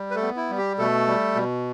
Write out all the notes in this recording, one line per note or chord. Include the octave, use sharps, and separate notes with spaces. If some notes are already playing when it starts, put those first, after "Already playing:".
Already playing: G3
B4
A3 A4
B3
E4
G3
G4
B2 A3 A4
G3
B2